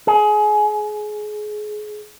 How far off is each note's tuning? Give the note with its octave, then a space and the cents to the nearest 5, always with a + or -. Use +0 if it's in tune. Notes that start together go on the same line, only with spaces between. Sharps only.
G#4 +25